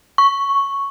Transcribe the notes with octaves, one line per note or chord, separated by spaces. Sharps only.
C#6